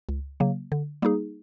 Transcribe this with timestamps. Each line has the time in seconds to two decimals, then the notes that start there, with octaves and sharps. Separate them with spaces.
0.09 C#2
0.40 C#3 F#3 A#3
0.72 D3
1.02 G3 A#3 D#4 G#4